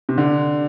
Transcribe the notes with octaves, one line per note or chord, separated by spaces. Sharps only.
C3
D3